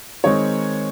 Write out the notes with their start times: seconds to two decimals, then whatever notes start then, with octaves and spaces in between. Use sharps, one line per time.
0.24 D#3 G#3 C4 D#4 C#5